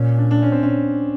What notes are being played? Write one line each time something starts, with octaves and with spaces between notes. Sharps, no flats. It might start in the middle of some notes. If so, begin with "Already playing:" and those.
Already playing: A#2 C#4
D4
D4
C#4
C4
C#4